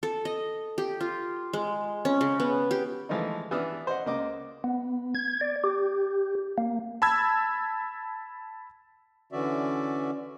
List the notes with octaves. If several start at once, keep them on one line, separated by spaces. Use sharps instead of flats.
A4
D#5
G4
F4
G#3
C#4
C#3
B3
G4
E3 F3 G#3 A3 D#4
E3 B3 D4 E5 D#6 F6
C5 D#5 F#5
C#2 A#3 D#5 D6
B3
G#6
D5
G4
A#3
A5 B5 E6 G#6
D3 E3 C#4 F#4 D5 E5